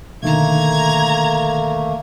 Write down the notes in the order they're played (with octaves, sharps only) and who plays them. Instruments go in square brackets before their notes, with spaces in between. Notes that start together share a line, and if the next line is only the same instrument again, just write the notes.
[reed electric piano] B2 D3 D#3 [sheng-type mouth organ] A3 A#3 [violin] A#5 G#6